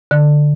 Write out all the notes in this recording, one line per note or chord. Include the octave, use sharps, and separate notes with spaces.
D3